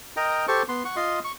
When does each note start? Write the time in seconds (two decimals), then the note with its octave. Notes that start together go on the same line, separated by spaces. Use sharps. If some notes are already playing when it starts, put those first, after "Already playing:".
0.17 A#4 D#5 G5 A#5
0.48 G4 A4 C5 C#6
0.69 B3 C6
0.85 F#5 C#6
0.96 F4 D#5 C6
1.24 C#6